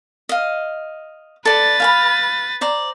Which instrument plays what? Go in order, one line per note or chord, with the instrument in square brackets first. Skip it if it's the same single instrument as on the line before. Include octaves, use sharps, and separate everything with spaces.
[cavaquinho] D#5 F5
[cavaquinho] A4 D5 [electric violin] B4 A6
[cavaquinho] F5 G#5 B5
C5 D5 A#5